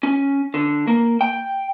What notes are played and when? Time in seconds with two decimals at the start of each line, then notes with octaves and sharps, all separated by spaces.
0.03 C#4
0.54 D3
0.87 A#3
1.21 G5